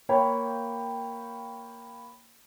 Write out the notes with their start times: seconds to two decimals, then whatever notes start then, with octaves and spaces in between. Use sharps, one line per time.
0.09 A#3 C#5 G5 B5